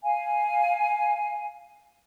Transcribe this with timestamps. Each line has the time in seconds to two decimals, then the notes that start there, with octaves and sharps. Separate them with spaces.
0.03 F5 G#5